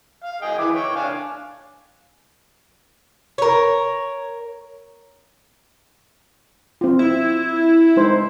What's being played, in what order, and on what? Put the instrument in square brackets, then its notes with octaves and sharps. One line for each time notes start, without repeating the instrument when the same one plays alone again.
[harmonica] F5
G#4 D#5 G5
E3 E5 D6
C#5 G5
D4 F5 G#5
[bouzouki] A#4 C#5
[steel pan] C4 F4
[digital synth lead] E4
[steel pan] G#3 D#4 C5